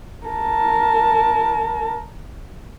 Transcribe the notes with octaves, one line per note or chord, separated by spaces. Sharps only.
A#4 A5